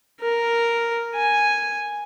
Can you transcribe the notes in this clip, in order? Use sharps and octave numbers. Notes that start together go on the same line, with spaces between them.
A#4
G#5